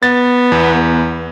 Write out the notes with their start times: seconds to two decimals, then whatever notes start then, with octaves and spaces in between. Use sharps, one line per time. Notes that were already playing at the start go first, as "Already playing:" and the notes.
0.03 B3 A6
0.52 E2